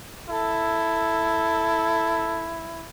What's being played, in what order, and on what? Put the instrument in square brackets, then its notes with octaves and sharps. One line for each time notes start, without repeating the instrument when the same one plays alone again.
[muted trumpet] E4 [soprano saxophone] A4